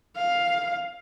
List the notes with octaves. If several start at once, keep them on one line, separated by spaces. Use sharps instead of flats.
F5